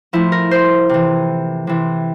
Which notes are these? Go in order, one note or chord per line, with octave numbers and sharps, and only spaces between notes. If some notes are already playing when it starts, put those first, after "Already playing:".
A2 F3 E4
A#4
C5
C3 E3
C3 E3